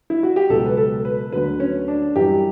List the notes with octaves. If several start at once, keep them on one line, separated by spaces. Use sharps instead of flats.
E4
F#4
G4
C#2 B2 F#3 A4
B4
A4
B4
D2 D3 F#3 B4
C#4
D4
F#2 E3 G3 G4